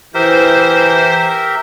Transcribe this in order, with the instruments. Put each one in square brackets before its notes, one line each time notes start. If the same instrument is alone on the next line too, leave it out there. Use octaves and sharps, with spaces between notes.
[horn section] E3 [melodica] G4 A#4 E5 [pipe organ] C5